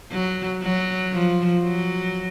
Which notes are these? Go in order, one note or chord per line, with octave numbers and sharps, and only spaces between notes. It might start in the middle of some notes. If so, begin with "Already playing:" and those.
F#3
F#3
F3
F#3